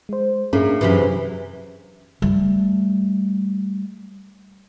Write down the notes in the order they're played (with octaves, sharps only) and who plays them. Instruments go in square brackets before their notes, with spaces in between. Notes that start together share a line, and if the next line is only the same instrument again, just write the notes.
[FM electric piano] G#3 C5
[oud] A2 A#3 [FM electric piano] C#4 D4 G#4
[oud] F#2 C3 E3
[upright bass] G3 A3